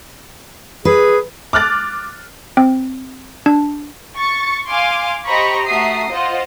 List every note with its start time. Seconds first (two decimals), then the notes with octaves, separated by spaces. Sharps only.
0.85 G#4 B4
1.53 D6 F6 F#6 A6
2.57 C4
3.46 D4
4.18 C#6 A6 C#7
4.69 F5 G#5 C6 D6
5.25 G4 C5 D#5 A#5 B5 C#6
5.65 A3 F#4 E5 A#5 D#6 C7
6.11 F4 C5 D#5 F#5